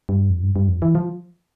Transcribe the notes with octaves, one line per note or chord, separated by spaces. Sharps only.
G2
F2
G2
G2
F2
E3
F3